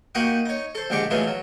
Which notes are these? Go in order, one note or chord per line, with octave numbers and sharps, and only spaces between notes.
A#3 D#4 F#4 G4 F#5 D#6
D#4 C#5
A4 C5
A#1 D3 G#3 G4 C#6 D6
E3 F#3 G#3 A3 B3 F4
F#3